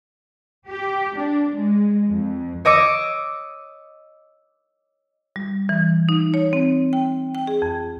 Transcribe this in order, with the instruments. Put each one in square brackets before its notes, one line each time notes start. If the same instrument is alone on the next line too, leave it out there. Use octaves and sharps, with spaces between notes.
[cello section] G4
D4
G#3
F2
[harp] C#5 D#5 D6 E6 C#7
[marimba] G3
E3
D#4
C#5
C4
G5
G5
G#4
F2